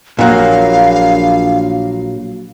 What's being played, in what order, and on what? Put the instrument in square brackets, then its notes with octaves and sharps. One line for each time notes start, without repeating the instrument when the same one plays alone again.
[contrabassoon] A#1 [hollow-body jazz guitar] A#2 F#3 A#3 [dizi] F5